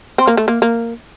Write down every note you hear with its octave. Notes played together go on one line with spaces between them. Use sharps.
C4
A#3
A3
A#3
A#3